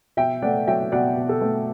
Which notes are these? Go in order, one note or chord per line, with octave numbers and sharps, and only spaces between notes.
B2 E5 G5
A3 D5 F#5
F#3 E5 G5
B2 D5 F#5
B2
A4
A3